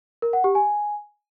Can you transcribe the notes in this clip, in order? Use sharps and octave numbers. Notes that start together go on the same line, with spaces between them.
A#4
F#5
G4
G#5